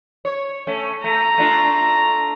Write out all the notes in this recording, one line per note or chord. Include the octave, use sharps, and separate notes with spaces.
C#5
A3 C#4
A3 A#5
A3 D4 F4